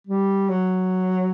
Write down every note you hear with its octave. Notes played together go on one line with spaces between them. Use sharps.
G3
F#3